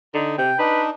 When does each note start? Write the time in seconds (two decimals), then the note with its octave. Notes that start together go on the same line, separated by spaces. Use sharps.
0.14 D3 D#4
0.38 C3 G5
0.58 D4 D#4 B4